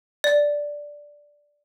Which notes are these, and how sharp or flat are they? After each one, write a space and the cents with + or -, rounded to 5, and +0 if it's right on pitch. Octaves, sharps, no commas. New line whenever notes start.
D5 +0